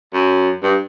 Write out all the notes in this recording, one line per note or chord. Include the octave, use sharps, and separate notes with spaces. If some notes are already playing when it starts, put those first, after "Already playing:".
F#2
G2